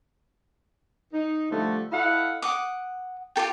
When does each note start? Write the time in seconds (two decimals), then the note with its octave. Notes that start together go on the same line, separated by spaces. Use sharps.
1.13 D#4
1.51 D3 F3 G3 A3
1.92 E4 A4 D#5 F5 F#5
2.42 F#5 D6 D#6
3.36 F4 G4 A4 G5